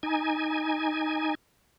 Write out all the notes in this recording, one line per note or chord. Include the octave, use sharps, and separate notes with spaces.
D#4 G#5